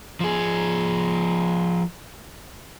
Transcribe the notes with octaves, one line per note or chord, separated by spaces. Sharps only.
F3 G#4